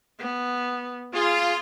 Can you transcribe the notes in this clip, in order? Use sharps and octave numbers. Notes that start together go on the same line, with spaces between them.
B3
F4 G#4